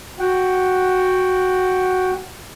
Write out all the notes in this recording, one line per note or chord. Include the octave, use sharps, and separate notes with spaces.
F#4 F#5 G5